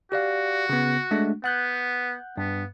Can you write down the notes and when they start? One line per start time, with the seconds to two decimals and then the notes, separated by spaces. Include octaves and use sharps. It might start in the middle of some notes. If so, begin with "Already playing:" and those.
0.12 F#4 G4 D5 F5
0.69 C#3 B3
1.11 G#3 A3 D4
1.44 B3 F#5 F#6 G6
2.37 G2 B3